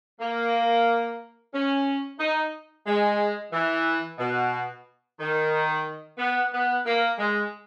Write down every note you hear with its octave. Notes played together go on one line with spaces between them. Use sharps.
A#3
C#4
D#4
G#3
E3
B2
D#3
B3
B3
A#3
G#3